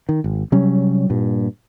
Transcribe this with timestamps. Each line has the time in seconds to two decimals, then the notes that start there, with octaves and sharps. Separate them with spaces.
0.09 D#3
0.24 G#1
0.52 C3 F#3 G3 C#4
1.10 G2 A#2